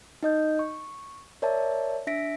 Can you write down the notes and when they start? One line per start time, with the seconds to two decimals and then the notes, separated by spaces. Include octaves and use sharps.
0.23 D#4 D#5 G6
0.59 C#6
1.42 A#4 C#5 D5 E5 A5
2.07 D4 E5 A#6 B6 D7